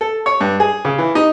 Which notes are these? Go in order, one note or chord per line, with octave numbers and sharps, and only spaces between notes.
A4
C#5
G2
G#4
C#3
E3
D#4